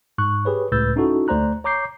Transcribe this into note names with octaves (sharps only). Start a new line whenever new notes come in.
G#2 C#6 F#6
G4 G#4 B4 C#5
C#2 A2 B4 E6 G6 A6
C#4 D#4 E4 F#4 A4
D2 A3 C5 D5 A#5 F#6
C#5 A#5 D6 G6 C7